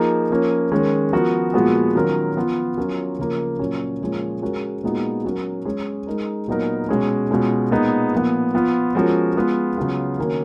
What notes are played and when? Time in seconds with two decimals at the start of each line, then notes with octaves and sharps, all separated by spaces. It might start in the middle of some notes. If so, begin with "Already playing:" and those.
Already playing: F3 A#3 D#4 G#4
0.30 F3 A#3 C#4
0.72 D#3 G#3 C#4
1.13 F3 B3 F#4 A#4
1.54 A#2 F3 G#3 B3 F#4
1.95 D#3 F#3 C#4 F4 A#4
2.36 F3 B3 F4
2.78 F#3 C#4 F4 A#4
3.19 C#3 F3 A#3
3.59 A#2 F#3 C#4
4.01 A#2 F3 G#3 C#4
4.42 G#3 C#4 F#4 A#4
4.83 A#2 G#3 B3 D#4 F#4
5.24 F#3 C#4 F#4 A#4
5.65 G#3 C#4 G#4
6.07 G#3 D#4 A#4
6.48 A#2 F#3 B3 D#4 A#4
6.89 B2 G#3 C#4
7.30 B2 G#3 C#4 F4
7.71 A#2 G#3 B3 D#4
8.13 A#2 F3 B3
8.54 F3 B3 F4
8.95 F3 G#3 C#4 F#4 A#4
9.36 G#3 B3 F4
9.77 C#3 F#3 B3 F4
10.18 D#3 A#3 C#4 F#4